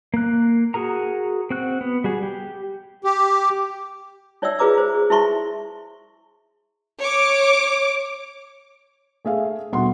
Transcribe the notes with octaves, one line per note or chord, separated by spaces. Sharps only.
A#3 F#6
F#4 G#4 A#4 A#5
C4 F#4 F#6
B3
G3 F#4 G#4
G4
G4
D#4 C#5 D5 E5 G5 E6
F4 G#4 B4 A#5 D6 E6
C5
G#4
E4 G#4 E5 A5 C6 C#6
C#5 D6
A3 G#4 E5 F5
D#1 B2 F#5 C6